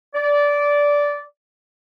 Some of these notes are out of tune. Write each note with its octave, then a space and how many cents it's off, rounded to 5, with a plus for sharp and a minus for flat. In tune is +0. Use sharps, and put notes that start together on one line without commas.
D5 -15